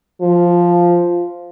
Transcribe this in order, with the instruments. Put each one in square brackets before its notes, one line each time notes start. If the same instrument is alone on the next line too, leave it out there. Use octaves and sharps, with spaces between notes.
[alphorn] F3